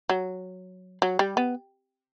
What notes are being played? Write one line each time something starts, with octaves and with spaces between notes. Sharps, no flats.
F#3
F#3
G3
B3